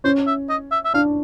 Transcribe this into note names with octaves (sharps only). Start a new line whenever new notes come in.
C#4 C5
E5
D#5
E5
E5
D4 F5